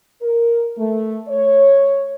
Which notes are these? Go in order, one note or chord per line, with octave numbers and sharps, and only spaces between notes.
A#4
A3
C#5